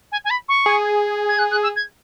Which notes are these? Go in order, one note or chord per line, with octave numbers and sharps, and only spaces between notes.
G#5
G#5
B5
C#6
G#4
G#6
F#6
F#6
E6
G#6